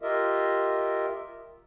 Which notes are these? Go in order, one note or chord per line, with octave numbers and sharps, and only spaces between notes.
F4 G4 A#4 D#5 E5